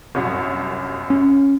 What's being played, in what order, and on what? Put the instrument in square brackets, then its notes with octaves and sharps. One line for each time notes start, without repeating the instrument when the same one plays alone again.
[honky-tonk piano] G1 C2 F#2
[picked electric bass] C#4